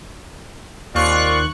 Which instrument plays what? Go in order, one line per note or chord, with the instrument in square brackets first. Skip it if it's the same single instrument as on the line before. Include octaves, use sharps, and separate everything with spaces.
[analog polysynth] D#2 C#6 F#6 [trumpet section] C4 F4 D5